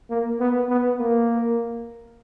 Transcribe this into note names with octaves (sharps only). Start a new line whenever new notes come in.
A#3
B3
B3
A#3